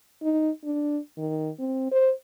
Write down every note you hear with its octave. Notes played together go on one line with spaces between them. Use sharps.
D#4
D4
D#3
C4
C5